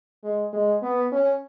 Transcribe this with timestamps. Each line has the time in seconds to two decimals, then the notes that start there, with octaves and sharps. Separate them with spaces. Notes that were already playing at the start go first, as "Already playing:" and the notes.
0.24 G#3
0.53 G#3
0.83 B3
1.12 C#4